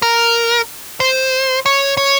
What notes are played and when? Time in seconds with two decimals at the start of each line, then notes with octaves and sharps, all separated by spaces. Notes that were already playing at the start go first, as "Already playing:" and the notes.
0.02 A#4
1.00 C5
1.66 C#5
1.97 C#5